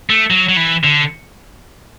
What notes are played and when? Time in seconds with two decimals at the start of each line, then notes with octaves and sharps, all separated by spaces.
0.10 A3
0.30 F#3
0.49 F#3
0.57 E3
0.84 D3